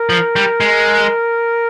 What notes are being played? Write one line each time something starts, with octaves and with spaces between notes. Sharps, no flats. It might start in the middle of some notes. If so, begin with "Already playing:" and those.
Already playing: A#4
F3
G3
G#3